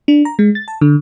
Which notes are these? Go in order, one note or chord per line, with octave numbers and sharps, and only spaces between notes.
D4
A#5
G#3
A6
A5
D3